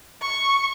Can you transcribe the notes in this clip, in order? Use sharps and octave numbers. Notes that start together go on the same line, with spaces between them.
C#6